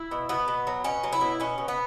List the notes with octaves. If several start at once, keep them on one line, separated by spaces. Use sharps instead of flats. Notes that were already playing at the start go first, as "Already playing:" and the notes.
Already playing: E4
B2
B2 B3
B2
F#3
B2 C#4
F#3
E4
B2
B2 C#4
B2
B3